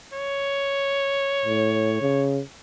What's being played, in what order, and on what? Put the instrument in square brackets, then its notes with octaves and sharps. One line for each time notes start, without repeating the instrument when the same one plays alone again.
[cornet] C#5
[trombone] A2
C#3